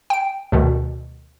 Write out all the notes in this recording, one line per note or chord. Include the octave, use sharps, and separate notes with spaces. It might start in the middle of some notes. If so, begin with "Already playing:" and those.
G5 D7
D2 B2 D#3